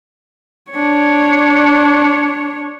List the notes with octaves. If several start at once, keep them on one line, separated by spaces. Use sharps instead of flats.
D4 C#5